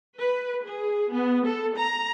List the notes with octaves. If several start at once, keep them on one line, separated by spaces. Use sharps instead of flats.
B4
G#4
B3
A4
A#5